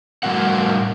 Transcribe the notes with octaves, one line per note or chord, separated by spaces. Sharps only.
A2 G3 C#4 F#4 A#4 F#5